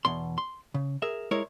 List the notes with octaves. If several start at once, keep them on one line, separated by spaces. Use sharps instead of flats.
E2 B2 C6
C6
C#3
G#4 A#4 E5
G#3 E4 A#4 C#5